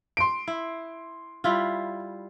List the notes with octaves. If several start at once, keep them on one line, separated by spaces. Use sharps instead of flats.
C6 D7
E4
G3 E4 F4